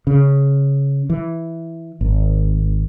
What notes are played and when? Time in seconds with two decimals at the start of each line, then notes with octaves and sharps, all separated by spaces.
0.07 C#3
1.10 E3
2.01 G#1